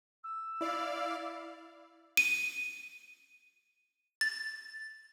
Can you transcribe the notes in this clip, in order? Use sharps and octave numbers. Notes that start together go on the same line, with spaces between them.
E6
E4 D5 F5
D#7
A6